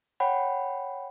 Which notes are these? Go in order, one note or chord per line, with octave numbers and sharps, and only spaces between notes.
C#5 F#5 G5 B5